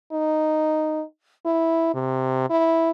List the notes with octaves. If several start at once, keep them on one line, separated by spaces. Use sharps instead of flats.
D#4
E4
C3
E4